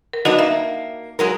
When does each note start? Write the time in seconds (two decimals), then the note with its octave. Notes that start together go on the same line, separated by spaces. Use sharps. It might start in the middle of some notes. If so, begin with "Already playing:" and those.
0.13 A#4
0.25 F#3 B3 D4 D#4 F#4 D#5
0.39 A#3 E5
1.19 F#3 G#3 A#4